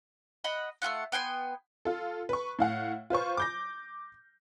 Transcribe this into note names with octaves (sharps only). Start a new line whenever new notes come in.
D#5 F#5 B5
A3 A#3 F4 F#5
B3 G5 G#5 C6
F4 A4
B4 C#6
A2 F5 F#5
F4 B4 C5 C#6
D6 G6 A#6